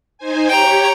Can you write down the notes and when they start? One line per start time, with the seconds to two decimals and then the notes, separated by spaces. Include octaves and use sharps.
0.18 D#4 C5 G#5
0.50 G4 C#5 G5 A#5